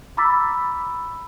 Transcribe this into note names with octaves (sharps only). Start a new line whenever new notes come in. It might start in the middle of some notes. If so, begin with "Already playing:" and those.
A#5 B5 D6 E6 A6 B6